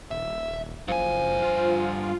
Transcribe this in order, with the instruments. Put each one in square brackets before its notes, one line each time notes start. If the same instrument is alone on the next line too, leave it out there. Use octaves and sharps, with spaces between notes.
[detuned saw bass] D#1 [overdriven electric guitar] E5
[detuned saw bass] F#1 [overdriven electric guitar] G2 G#5 [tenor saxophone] F3
[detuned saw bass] F4